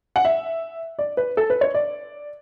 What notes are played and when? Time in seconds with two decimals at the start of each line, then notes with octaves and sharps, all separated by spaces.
0.16 F#5
0.25 E5
0.99 D5
1.17 B4
1.37 A4
1.50 B4
1.61 C#5
1.74 D5